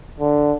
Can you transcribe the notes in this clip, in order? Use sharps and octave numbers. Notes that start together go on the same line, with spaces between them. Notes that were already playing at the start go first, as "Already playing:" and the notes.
D3